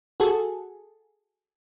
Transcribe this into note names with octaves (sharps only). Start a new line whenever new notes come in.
F#4 G#4 A4